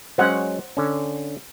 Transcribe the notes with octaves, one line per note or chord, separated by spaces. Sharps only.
F#3 G#3 C#4 C5 F#5
D3 C#4